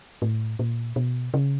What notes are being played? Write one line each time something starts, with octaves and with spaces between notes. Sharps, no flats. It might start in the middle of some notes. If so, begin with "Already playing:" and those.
A2
A#2
B2
C#3